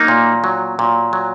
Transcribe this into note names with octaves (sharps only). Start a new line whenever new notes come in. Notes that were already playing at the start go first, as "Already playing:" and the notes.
Already playing: F#3 A#3 D#4
A#2
F#3
A#2
F#3